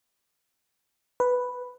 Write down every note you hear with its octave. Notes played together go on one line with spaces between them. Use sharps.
B4